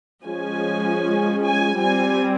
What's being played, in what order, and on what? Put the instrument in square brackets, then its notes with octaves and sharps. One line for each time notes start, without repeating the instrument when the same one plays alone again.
[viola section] F3 G#3 C#4 G#5
G#5
G3 C4 G#5